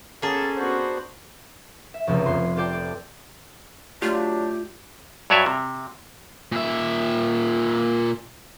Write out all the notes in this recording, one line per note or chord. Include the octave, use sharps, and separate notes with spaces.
A#3 B3 C#4 G#4 A4 A5
B3 D4 F#4 C5
E5
F1 C#2 F3 A3 A#5 E6
F2 B3 C6
F4 G4 A4 D5 G5
D5
F#3 A3 D4 F4 G4
G2 F#3 C#5 D5 E5
C3
A#2 E5